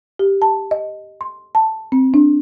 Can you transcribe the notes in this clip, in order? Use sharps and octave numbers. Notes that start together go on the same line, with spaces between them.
G4
A5
D#5
C6
A5
C4
D4